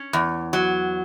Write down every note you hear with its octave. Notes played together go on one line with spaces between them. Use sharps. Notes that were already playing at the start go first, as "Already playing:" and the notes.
Already playing: C#4
E2
F#3